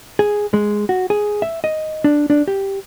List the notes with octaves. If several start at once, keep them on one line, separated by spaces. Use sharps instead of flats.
G#4
G#3
F#4
G#4
E5
D#5
D4
D4
G4